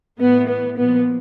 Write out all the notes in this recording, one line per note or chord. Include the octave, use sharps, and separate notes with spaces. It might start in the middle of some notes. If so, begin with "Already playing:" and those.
A2 E3 B3
B3
A#2 F3 B3